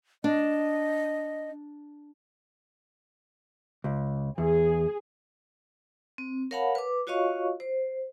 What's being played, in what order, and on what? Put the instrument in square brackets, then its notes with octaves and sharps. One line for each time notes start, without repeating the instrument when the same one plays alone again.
[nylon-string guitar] D4 [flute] D#5
[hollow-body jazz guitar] C#2
[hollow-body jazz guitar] E2 [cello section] G#4
[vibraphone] C4
A#4 C#5 F5 F#5 A5 B5
B4 D6
F4 F#4 C#5 D#5 F5 C#6
C5